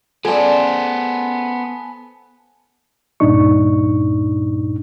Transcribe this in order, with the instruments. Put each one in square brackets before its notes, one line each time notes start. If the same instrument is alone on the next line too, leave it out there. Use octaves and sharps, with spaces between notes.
[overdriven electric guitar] B3 C5 [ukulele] G#4 D5 [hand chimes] A4 [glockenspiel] G#5 A5
[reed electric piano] C#2 G2 A#2 D4 D#4 C#6